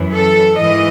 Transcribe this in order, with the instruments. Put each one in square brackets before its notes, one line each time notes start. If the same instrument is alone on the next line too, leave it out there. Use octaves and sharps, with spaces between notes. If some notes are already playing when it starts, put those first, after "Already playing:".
Already playing: [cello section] F#2 E3
A4
G#2 E3 D#5